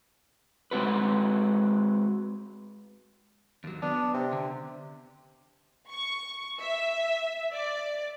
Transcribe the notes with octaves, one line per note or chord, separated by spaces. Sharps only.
G#3 C4 F#4 B4
D#2 F#3
B3 D4
C3
D3
C#6
E5
D5